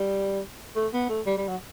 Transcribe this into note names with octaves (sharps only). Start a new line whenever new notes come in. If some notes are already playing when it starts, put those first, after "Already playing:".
Already playing: G3
A3
B3
A3
G3
G3
F#3